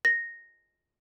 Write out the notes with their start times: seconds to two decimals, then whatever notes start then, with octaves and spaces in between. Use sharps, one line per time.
0.05 A#6